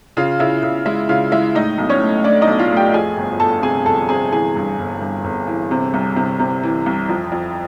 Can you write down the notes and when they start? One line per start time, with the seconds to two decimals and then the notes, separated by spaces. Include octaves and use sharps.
0.17 C#3 F4 F5
0.39 C#3 E4 E5
0.63 C#3
0.86 G#3 E4 E5
1.09 C#3 F4 F5
1.32 G#3 E4 E5
1.55 A2 D#4 D#5
1.78 B1
1.90 C#4 C#5
2.01 A3
2.24 A3 D4 D5
2.41 D#4 D#5
2.47 B1
2.59 F4 F5
2.71 A3
2.76 G4 G5
2.94 F2 G#4 G#5
3.17 G1
3.40 G1 A4 A5
3.62 C3 G#4 G#5
3.86 G1 A4 A5
4.09 C3 G#4 G#5
4.32 E3 G#4 G#5
4.56 G2
4.79 G1
5.01 G2
5.24 G1
5.48 E3
5.71 C3
5.94 C2
6.16 C3
6.39 C3
6.63 E3
6.86 C2
7.09 F2
7.32 F2